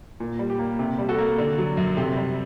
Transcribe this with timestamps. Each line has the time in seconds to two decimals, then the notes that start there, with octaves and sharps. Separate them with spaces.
0.20 A#2
0.39 G3
0.50 G4
0.59 A#3
0.79 C3 G4
0.98 G3
1.09 F#4 A4
1.18 A#3
1.38 D3
1.58 F#3
1.77 F#2
1.97 C3
2.16 G3